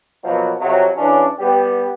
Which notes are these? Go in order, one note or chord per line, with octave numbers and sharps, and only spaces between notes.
B2 F3 F#3 A#3 B3
F2 C3 F#3
C#3 E3 C#4 D4
G3 B3 G4